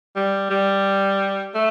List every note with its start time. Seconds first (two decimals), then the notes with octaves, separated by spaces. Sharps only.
0.16 G3
0.50 G3
1.55 A3